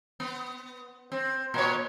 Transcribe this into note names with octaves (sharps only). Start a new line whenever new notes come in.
B3
C4
A#2 C#5